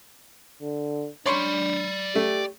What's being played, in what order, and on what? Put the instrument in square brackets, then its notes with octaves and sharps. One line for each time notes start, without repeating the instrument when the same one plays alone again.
[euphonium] D3
[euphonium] D4 [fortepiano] C#5 C6 [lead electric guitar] D5 B5
[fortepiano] A3 [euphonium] G4